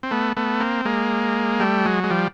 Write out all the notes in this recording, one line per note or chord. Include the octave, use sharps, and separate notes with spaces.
C4
A3 B3
A3 B3
A#3 C4
G#3 A#3
G3 A3
F#3 G#3
G#3
F3 G3